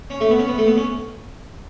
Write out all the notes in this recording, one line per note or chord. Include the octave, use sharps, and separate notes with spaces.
C#4
A3
B3
C#4
B3
A3
B3
C#4